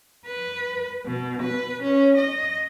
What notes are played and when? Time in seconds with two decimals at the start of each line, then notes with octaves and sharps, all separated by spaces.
0.26 B4
1.06 B2
1.43 B4
1.83 C#4
2.18 D#5